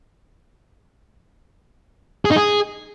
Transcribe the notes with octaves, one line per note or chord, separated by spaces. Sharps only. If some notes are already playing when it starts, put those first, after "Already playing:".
G#4
D#4
G#4